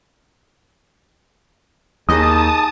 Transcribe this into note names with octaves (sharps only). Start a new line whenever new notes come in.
D#2 G#4 D#5 A5 D#6